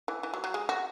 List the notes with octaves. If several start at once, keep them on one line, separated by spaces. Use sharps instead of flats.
E3
E3
F#3
F#3
G#3
F#4